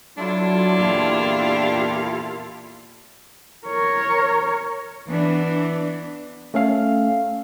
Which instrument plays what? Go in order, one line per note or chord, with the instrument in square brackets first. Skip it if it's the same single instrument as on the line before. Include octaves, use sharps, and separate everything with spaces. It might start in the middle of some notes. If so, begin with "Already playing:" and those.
[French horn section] F#3 [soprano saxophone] D4 [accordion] E4 F4 A4
[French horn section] E2 A#2 [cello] G4 F5
[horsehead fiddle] A#4 C#5
[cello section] E3 B3 D4
[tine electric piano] A3 C#4 A4 F5